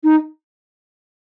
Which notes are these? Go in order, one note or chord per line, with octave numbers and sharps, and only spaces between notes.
D#4